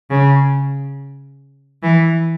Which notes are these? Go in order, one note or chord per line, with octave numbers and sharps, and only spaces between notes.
C#3
E3